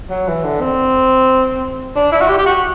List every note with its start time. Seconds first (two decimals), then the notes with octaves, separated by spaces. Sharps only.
0.10 F#3
0.28 E3
0.44 D3
0.61 C4
1.96 D4
2.12 E4
2.21 F#4
2.28 G4
2.38 G4
2.46 F#4